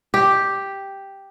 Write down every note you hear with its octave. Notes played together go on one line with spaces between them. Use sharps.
G4